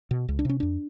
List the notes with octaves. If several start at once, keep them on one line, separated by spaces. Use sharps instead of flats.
B2
C#2
D4
C3 C#4
F2 D4